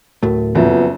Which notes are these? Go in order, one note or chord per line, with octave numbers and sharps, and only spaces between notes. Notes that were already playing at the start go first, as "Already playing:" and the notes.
D1 A2 A3 F#4 A#4
F#1 F2 B3 F#4 E5